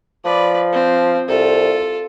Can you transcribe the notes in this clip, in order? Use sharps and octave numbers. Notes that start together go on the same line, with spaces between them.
F3 B4 D5
C4
C2 F4 A4